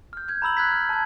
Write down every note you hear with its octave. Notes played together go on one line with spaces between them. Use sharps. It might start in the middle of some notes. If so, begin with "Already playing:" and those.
F6 G6
G6 G#6
A#5 B5 E6 F#7
F#6 G#6 B6
F6
A5 G#6